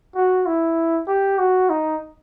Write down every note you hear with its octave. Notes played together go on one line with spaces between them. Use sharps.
F#4
E4
G4
F#4
D#4